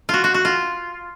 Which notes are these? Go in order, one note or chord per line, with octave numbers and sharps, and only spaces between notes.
F4 F#4
F#4
F#4
F4